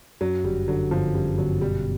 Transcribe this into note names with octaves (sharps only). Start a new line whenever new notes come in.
F#2 F#3
G1 G3
D3 F#3
G1 F3
F#2 G3
G1 F#3
B2 G3